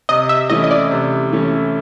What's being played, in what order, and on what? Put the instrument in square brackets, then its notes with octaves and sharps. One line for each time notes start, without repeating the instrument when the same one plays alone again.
[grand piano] C3 [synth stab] D#5
[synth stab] E5
[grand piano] E3 A3 C#4 E4 [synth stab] D#5
[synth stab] D#5
D5
[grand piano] C3
E3 A3 C#4 E4